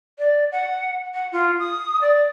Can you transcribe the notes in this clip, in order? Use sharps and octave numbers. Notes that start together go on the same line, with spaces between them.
D5
F#5
F#5
F4
D#6
D5